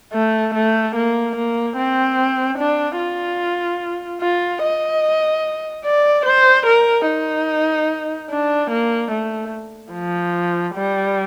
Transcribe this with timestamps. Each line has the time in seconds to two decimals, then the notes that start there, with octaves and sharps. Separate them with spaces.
0.14 A3
0.55 A3
0.96 A#3
1.36 A#3
1.77 C4
2.58 D4
2.99 F4
4.21 F4
4.63 D#5
5.85 D5
6.26 C5
6.67 A#4
7.07 D#4
8.30 D4
8.70 A#3
9.12 A3
9.93 F3
10.75 G3